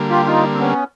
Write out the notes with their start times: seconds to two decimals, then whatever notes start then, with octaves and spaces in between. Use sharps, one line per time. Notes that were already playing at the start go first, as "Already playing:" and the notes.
Already playing: D3 G3 A#3
0.09 F4 G4
0.26 D#4 F4
0.53 C4
0.60 B3 C#4